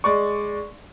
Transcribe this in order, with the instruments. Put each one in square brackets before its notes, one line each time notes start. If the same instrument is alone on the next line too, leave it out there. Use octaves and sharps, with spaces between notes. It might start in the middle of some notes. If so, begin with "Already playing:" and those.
[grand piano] G#3 D5 C#6